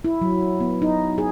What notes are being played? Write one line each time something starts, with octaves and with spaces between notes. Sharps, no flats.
E4
F#3
B3
D#4
G#4